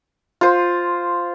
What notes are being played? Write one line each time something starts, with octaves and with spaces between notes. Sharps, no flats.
F4 C5